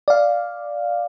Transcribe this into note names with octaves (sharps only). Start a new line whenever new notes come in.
D5 F5